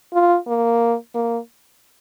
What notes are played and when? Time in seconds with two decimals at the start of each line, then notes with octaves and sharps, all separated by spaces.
0.13 F4
0.47 A#3
1.14 A#3